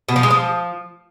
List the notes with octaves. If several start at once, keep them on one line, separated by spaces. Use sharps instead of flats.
B2
F3
G#3
F3